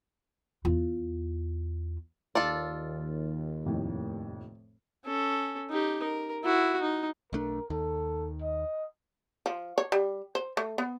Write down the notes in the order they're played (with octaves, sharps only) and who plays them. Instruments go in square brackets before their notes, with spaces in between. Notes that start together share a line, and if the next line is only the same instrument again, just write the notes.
[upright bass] E2 F4
[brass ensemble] D#2 [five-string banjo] F4 A4 D5
[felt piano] F1 F2 A2
[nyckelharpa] C#4 A4
D#4 G4
A#4
E4 F#4
D#4
[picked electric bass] B1 A3 D4 [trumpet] A#4
[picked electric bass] D#2 D#3 [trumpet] A4
[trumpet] D#5
[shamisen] F3
C#5
G3
C5
A3
B3